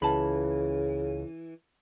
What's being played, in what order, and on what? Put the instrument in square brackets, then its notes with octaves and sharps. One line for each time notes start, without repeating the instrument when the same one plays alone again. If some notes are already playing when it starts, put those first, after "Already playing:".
[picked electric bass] C#2 [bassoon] C#3 [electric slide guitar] E3 [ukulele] F4 A5 B5